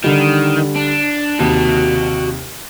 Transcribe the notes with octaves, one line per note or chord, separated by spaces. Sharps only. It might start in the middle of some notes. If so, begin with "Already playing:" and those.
D3 D#3 G3
D4
D#2 C3 F#4 A5